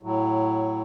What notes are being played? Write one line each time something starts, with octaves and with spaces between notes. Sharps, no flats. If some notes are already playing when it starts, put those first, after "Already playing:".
A2 F#3